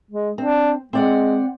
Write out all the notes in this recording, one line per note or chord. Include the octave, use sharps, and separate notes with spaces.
G#3
C4 D4
G#3 C4 D5 F#5